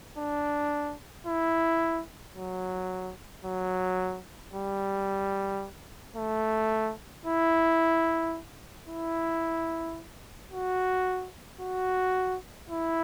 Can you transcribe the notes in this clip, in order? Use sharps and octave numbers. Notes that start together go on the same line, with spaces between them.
D4
E4
F#3
F#3
G3
A3
E4
E4
F#4
F#4
E4